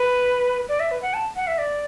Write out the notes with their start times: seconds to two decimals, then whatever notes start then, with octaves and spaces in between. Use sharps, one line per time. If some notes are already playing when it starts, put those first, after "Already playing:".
Already playing: B4
0.69 D5
0.80 E5
0.91 B4
1.02 F#5
1.14 A5
1.36 F#5
1.47 E5
1.58 D5